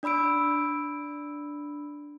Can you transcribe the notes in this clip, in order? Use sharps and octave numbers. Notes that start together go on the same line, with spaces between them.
D4 D5 B5 E6 D7